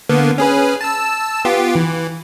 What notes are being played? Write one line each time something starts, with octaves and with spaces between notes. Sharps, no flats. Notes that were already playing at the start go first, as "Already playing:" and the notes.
D3 A#3 B3
C#4 G#4 B4
A5 E6
B3 F4 G4
E3